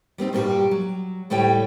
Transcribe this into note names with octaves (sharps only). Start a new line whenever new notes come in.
G3 B3 C4 D#4
G2 A#2 G3 D4 F#4 G4
F#3
D2 A2 G3 A3 C#5 G5